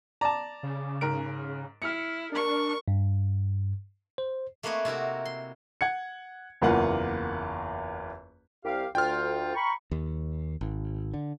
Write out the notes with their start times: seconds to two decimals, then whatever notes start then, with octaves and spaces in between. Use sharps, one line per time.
0.21 D5 A5 A#5
0.63 C#3
1.01 G#2 A#4 D7
1.82 E4 F6 C#7
2.32 D4 A#4 C#6
2.88 G2
4.18 C5
4.63 A3 A#3 C4 B4 C#5 D#5
4.85 C3 E4 F#4 A#4
5.25 C6
5.81 F#5 G#6 C#7
6.62 F#1 E2 A#3 F4 F#5
8.65 C2 G4 F5
8.95 D2 F4 G5 F6
9.54 A#5 B5 C#6
9.91 D#2
10.61 G#1
11.14 D3